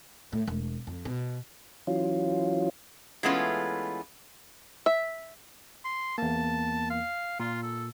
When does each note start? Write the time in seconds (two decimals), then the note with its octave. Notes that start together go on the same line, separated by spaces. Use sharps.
0.33 A2
0.47 E1
0.87 F2
1.05 B2
1.87 E3 F#3 C#4 F4
3.23 E3 G#3 A3 B3 C#4 F4
4.86 E5
5.84 C6
6.18 E2 A#3 A5
6.90 F5
7.40 A#2 F4
7.63 A4